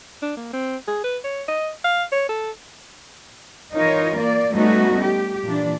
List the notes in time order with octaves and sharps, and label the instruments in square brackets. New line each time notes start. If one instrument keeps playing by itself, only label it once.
[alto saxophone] D4
A#3
C4
G#4
B4
C#5
D#5
F5
C#5
A4
[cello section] E3 D#4 F4 A#4 C#5
A#3 D5
G3 A3 B3 C#4 D#4 F#4
G4
A#2 E3 D4